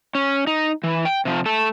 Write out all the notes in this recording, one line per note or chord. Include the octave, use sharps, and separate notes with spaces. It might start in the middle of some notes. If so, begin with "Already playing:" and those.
C#4
D#4
E3
G5
C3 F3
A3 A4